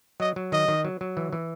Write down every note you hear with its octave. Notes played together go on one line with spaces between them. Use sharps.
F#3 D#5
F#3
D#3 D#5
D#3
F#3
F#3
E3
E3